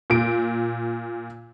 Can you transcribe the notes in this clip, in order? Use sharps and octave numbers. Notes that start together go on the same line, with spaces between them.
A#2 D7